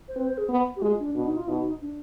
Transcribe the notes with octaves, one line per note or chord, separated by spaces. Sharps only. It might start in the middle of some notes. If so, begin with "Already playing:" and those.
C5
C4 B4
C5
G#4
B3
G4
G#3 F4
D4
B2 D4
D#4
F4
B2 D#4
D4